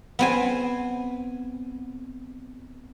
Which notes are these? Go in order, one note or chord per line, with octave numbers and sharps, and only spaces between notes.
B3 C4 G#5